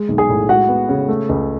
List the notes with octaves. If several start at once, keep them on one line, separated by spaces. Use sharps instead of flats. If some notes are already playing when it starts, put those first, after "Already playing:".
Already playing: G#3
B1
G#4 G#5
A2
G#3 F#4 F#5
B3
C#3
A3
C#2